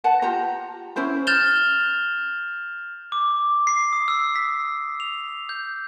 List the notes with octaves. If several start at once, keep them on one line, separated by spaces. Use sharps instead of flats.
B4 F#5 A5
F4 G4 A#5
C#4 E4 C5 B5
F6 G6 A6 E7 F7 G7
D6
C7
D#6
E6
B6
F7
G6